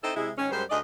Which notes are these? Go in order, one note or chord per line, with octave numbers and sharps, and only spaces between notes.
C4 D#4 E4 A4 C5 D#5
C3 G#3 E4
G#2 D#3 G#3 C#4
F#2 G3 G#3 C5
D2 G#4 D5 D#5